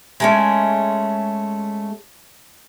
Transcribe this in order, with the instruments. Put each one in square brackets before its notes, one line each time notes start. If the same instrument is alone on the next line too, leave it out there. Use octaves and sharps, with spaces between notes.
[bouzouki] G#3 A3 C#4